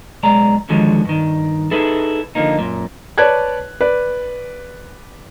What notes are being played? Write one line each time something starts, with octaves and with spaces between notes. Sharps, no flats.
B1 G#3 D5 A#5
D3 D#3 F3 F#3 G#3
G2 D#3
D#4 E4 G#4 A4 B4
D3 F3 A#3 D#4
F#2 A#2
B4 C#5 D5 A5 F#6 G#6
B4 D5